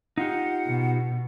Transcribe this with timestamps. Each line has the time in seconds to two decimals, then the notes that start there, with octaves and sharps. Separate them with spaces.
0.18 D#4 F4 G4 F#5
0.66 B2